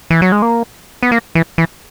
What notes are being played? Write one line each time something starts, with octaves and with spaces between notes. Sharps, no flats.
E3
F#3
G#3
A#3
B3
A#3
E3
E3